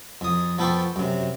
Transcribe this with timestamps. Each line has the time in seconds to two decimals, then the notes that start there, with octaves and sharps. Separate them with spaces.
0.21 F2 D#6
0.59 F3 B3 A4 G5 C6 C#6
0.96 F#2 C3